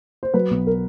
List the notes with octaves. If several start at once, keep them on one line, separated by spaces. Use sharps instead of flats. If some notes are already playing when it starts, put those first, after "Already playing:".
C5
F#3 B4
B1
A#4